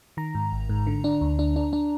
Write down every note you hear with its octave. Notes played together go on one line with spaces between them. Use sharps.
D#3 A#5
G#2
G#1
G#2
D3
D4
D2
D4
D4
D4